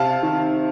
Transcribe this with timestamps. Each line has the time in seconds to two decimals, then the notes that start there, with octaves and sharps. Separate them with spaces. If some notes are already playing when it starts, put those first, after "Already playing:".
Already playing: C3 F5 A5
0.23 D#3